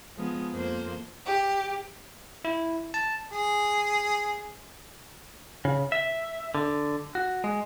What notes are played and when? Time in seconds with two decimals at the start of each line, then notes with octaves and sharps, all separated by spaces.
0.16 F3 G#3 B3
0.54 F2 A#3 C5
1.25 G4
2.45 E4
2.94 A5
3.32 G#4
5.65 C#3
5.92 E5
6.55 D3
7.15 F#4
7.44 G#3